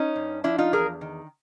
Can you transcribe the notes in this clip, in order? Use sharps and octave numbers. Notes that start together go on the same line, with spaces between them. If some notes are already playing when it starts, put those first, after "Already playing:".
Already playing: C#4 D#4
G2
F3 D4 E4
D#4 F4
E2 G#4 A#4
D#3